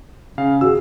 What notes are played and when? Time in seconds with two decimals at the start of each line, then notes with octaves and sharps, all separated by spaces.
0.38 C#3 C#4 F5
0.61 F#4 G#4 E6